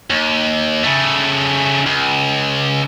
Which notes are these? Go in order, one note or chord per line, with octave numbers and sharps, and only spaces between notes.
D#2
C#3 A3
C#2